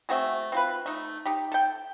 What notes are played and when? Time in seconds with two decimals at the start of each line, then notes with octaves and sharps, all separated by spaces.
0.09 A3 C4 F#4 G#4
0.52 C4 F4 B4
0.86 A3 D#4
1.26 D#4 G4
1.52 A4 G5